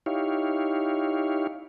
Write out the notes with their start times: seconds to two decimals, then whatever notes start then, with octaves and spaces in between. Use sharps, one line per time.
0.06 D#4 E4 G4 C#5 F5